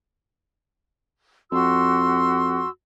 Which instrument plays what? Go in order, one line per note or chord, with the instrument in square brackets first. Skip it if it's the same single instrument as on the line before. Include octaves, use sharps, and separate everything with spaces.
[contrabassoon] F2 [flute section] F#4 C6 E6